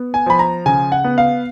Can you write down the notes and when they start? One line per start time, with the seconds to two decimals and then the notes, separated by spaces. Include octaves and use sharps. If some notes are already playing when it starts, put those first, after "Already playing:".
Already playing: B3
0.14 G#5
0.26 F3 B5
0.39 A#5
0.66 C#3 G#5
0.92 F#5
1.04 B3
1.18 F5